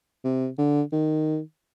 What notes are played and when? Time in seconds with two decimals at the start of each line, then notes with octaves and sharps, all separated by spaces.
0.24 C3
0.58 D3
0.92 D#3